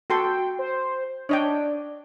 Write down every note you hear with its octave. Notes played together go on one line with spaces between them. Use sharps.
F#4 A4 G5 C6
C5
D4 C#5 D#5 G5